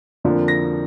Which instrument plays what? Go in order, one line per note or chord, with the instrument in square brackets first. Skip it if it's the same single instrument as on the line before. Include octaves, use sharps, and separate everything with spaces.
[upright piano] F2 D3 F3 A#3 D4
A#6